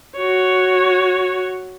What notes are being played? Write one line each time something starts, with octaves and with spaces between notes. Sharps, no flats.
F#4 C#5